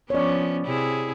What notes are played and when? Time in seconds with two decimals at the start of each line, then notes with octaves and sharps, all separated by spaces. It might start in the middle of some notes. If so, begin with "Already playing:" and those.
0.10 F3 B3 C#4 C#5 D5
0.66 C3 E4 G#4